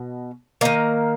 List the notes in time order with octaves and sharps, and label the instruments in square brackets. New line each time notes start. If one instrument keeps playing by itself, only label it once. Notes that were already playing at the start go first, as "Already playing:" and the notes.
Already playing: [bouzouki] B2
D#3 A#3 D#5